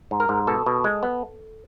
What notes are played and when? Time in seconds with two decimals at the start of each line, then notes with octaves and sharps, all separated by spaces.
0.11 G#2
0.20 A#4
0.29 G#2
0.47 B2 A4
0.66 B2
0.84 G#3
1.03 B3